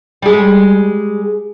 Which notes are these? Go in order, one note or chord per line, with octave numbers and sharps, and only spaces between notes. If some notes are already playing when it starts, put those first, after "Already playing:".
G3 G#3